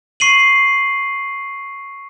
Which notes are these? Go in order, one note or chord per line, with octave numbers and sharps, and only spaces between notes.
C#6 C7 D#7 F#7